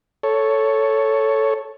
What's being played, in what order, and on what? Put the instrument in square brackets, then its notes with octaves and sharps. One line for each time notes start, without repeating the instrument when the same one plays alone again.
[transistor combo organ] A4 C#5